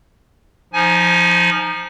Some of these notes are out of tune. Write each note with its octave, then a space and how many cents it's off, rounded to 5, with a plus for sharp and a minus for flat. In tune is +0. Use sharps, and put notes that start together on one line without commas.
F3 +0 D#4 +0 G#5 +20